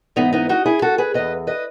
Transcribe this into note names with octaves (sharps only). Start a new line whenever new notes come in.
G#2 E3 B3 D#4
B3 D#4
D#4 F#4
E4 G#4
F#4 A4
G#4 B4
E2 B2 B4 D#5
B4 D#5